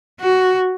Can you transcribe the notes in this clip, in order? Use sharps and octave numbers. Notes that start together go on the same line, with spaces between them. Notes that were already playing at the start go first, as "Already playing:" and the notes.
F#4